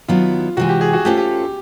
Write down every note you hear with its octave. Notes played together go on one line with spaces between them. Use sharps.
D#3 F#3 B3 E4 F4
C3 E3 G#3 F#4
G4
G#4
F#4
A3 C#4 F4 G4 A4 C5
G4